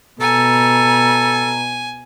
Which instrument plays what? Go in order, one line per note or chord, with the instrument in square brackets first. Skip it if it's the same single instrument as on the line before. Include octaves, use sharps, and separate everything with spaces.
[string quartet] B2 [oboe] A4 [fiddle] G#5 [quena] A#5